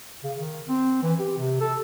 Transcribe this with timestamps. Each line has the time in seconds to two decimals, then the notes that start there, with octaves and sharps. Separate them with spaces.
0.24 C#3
0.37 D#3
0.68 C4
1.03 E3
1.20 G4
1.38 C3
1.60 A4